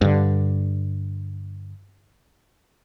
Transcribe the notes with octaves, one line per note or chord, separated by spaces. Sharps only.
G2 D3